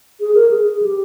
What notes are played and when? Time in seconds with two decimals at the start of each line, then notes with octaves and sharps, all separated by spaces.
0.20 G#4
0.35 A#4
0.51 G#4
0.66 G#4
0.82 G4